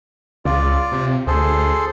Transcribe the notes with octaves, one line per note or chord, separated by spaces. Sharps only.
C#2 F4 D5
C3
D2 G#4 A4 C5